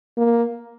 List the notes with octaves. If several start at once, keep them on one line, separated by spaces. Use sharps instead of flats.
A#3